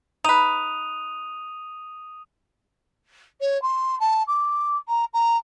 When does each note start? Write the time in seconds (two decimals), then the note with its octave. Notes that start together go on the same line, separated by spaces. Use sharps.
0.24 D#4 B4 D#6 D#7 F7
3.40 C#5
3.62 C6
4.00 A5
4.27 D6
4.88 A#5
5.13 A#5